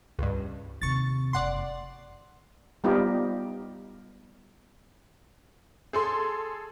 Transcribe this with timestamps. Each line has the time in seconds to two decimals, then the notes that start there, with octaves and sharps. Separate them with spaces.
0.19 C#2 G2
0.81 D#2 C3 C#6 A6
1.33 F#1 F2 D5 F#5 C6
2.84 G3 B3 D#4 F4 G4
5.93 G#4 A4 C6